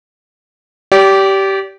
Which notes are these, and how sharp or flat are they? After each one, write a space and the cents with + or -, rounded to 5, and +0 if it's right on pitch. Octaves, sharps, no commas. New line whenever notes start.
G4 -15 D5 -35